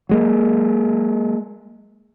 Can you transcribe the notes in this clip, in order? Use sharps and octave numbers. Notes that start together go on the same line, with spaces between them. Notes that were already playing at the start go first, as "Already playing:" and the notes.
F#3 G#3 A#3